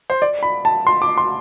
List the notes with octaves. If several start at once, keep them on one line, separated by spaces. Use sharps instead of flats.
C5
D5
B5
A5
C6
D6
C6